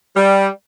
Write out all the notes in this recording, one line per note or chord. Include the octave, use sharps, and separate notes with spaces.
G3